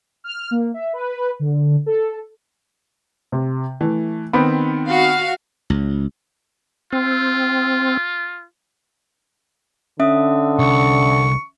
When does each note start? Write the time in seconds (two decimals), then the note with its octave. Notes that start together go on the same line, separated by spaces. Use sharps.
0.24 F6
0.51 A#3
0.74 E5
0.93 B4
1.40 D3
1.86 A4
3.32 C3
3.81 E3 A3
4.33 D#3 B3 C4 B5
4.89 F#4 F5
5.70 C#2
6.93 C4 F4
10.00 D3 C#4 E5 D#6
10.59 C2 C#6